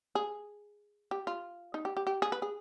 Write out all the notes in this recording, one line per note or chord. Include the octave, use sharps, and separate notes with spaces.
G#4
G4
F4
D#4
G4
G4
G4
G#4
B4
G#4